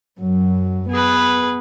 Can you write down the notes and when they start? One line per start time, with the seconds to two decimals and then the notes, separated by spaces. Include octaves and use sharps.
0.20 F#2 F#3
0.90 B3 G#4 B4